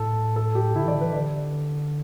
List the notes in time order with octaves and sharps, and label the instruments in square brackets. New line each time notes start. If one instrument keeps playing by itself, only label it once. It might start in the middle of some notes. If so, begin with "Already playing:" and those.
Already playing: [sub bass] A2 [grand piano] A4
[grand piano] A4
G4
[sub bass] D3 [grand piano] E4
[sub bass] E3 [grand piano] D5
[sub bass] D3
[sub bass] E3 [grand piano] B4
[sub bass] D3 [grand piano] D5